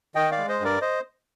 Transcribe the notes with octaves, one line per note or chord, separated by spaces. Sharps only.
D#3 D#5 G5
D5 F5
G#3
C5 D#5
G2 A#4 D5
C5 D#5